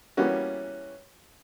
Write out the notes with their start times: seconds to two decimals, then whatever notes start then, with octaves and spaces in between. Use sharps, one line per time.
0.17 E3 G3 A#3 B3 C#4 F#4